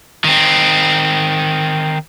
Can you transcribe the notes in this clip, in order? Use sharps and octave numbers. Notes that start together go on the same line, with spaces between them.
D#3 C4